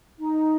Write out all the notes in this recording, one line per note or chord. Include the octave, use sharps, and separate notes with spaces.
D#4